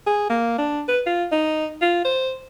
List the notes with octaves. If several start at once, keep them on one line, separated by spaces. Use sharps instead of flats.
G#4
A#3
D4
B4
F4
D#4
F4
C5